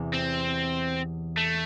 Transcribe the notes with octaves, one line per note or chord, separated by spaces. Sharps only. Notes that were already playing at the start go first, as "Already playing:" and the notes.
Already playing: E2 C3 E3
C4
A3